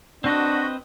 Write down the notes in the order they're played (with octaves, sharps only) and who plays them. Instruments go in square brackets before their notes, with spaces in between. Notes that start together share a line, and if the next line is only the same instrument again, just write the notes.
[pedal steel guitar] C4 B4 D#5 [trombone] D4 [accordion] F#4